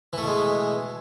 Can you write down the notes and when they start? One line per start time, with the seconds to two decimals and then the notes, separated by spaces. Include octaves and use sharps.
0.13 E3
0.18 A3
0.22 B2
0.27 G#3